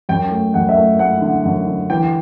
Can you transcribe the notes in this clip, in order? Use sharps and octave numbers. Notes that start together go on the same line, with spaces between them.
F#2 G5
A3
F#2 F#5
E5
A3
A3 F#5
D3
F#2
D3
E3 G5